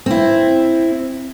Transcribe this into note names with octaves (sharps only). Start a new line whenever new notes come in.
C4 E4